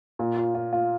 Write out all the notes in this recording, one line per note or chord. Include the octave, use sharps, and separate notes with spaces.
A#2
F4
F4
F4